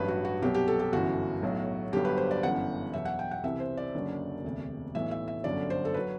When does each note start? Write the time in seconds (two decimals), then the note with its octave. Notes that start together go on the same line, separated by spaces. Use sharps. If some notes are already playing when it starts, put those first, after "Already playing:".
Already playing: A1 G2 F#3 B4
0.08 F#4
0.25 F#4
0.42 C2 B2 F#3 G4
0.54 G4
0.68 A4
0.79 G4
0.92 G1 F#2 E3 F#4
1.42 B1 A2 F#3
1.92 G1 G2 F#3 G4
2.05 B4
2.17 C5
2.31 D5
2.43 G1 F#2 E3 F#5
2.93 E2 B2 F#3 E5
3.05 F#5
3.19 G5
3.31 F#5
3.43 C2 C3 E3 E5
3.60 C5
3.77 D5
3.94 F#1 F#2 D3 F#3
4.44 E1 D2 C3
4.94 B1 A2 E3 E5
5.11 E5
5.28 E5
5.44 G1 F#2 D3 F#3 D5
5.70 C5
5.85 A4
5.94 B4
5.99 F#3